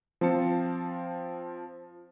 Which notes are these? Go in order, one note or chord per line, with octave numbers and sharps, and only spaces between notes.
F3 C4 F4 A5 C#7